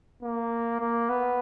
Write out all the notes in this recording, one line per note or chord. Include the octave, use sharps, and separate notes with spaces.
A#3
A#3
B3